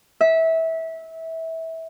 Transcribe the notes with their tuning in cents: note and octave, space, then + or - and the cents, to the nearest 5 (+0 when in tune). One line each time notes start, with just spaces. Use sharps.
E5 -20